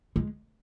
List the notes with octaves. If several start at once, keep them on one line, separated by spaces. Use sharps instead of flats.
G#3